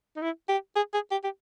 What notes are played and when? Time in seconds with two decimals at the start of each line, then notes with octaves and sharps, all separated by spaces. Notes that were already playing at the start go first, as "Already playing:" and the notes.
0.16 D#4
0.22 E4
0.49 G4
0.76 G#4
0.94 G#4
1.11 G4
1.24 G4